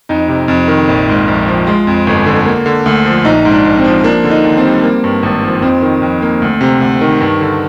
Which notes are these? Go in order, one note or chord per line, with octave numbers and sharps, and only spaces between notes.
F2 D#4
C3
F2
D#3
A#1
G#2
A#1
F3
G#3 F4
F2
G1
D3
A#3
D3
D2
F3
A#1 D#4
G#2
D4
A#1
C4
F3
A#3 D4
D3
D#4
D#2
C4
G3
A#3
G2
G#1
F3
F2 C4
D#3
F2
A#3
D2
C3
D2
D#3
G2
D3